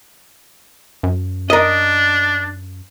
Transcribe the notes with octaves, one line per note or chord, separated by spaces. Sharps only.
F#2
D4 A#4 D#5